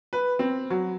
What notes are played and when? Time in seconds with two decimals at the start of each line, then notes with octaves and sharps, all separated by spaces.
0.13 B4
0.39 C4
0.70 F#3